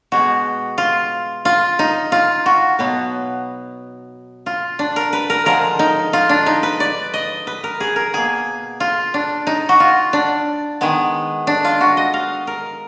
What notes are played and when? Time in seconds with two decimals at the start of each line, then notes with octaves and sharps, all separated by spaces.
0.12 B2 G#3 B3 F#4
0.78 F4
1.45 F4
1.79 D#4
2.12 F4
2.46 F#4
2.79 B2 F#3 B3
4.46 F4
4.79 D4
4.96 A#4
5.13 B4
5.30 A#4
5.46 D3 F3 G#3 A#4
5.79 D#4
6.13 F4
6.29 D4
6.46 D#4
6.63 B4
6.80 D5
7.14 D#5
7.47 B4
7.64 A#4
7.80 G#4
7.96 A#4
8.13 B2 A#3 G#4
8.80 F4
9.14 D4
9.47 D#4
9.69 F#4
9.80 F4
10.13 D4
10.81 D#3 G#3 B3
11.47 D4
11.65 F4
11.81 F#4
11.97 D#5
12.14 F5
12.47 A#4